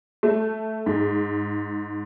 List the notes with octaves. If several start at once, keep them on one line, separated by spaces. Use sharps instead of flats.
A3
G#2